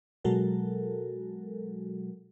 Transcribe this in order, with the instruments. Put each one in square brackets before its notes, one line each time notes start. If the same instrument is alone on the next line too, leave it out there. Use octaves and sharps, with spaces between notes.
[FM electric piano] B2 F#3 G#3 F#4 A4 A#4